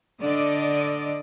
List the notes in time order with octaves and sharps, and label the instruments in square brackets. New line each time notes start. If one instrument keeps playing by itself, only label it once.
[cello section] D3 D5 D#5